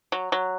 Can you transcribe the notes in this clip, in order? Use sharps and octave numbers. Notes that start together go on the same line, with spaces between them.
F#3
F#3